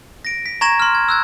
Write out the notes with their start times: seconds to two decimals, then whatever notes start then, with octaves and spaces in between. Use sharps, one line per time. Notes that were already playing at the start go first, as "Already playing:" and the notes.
0.25 A#6 D7
0.46 B6
0.61 A#5 C#6 G#6 A#6 E7 F#7
0.80 C6 F6
0.95 G#6
1.09 E6 F#6 G#6